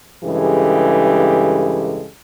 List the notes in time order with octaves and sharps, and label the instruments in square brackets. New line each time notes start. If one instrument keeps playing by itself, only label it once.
[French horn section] G2 C#3 E3 G#3 G4 A4